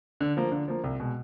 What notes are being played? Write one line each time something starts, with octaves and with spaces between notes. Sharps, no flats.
D3
F3 A#3
D3
F3 A#3
C2
B2 G#3